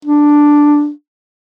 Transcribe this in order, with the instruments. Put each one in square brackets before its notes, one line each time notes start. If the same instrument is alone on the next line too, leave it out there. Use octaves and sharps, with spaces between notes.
[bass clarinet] D4